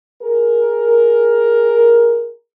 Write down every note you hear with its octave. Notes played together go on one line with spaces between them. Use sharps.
G#4 A#4